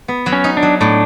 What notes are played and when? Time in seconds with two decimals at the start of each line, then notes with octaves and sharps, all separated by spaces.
0.08 B3
0.26 F#3
0.33 C#4
0.44 D#4
0.57 D4
0.63 F#3
0.80 A2 D4